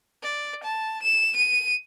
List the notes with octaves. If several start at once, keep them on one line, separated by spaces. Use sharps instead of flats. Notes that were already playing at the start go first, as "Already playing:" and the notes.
D5
A5
E7
D#7